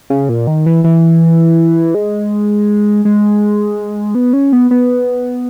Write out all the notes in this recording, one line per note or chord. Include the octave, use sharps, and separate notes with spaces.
C#3
A#2
D#3
E3
E3
G#3
G#3
B3
C#4
B3
B3